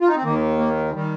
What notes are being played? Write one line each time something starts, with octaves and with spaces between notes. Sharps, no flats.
F4
D#4
C4
D#2 D#3 A#3
A#3
D#3 G3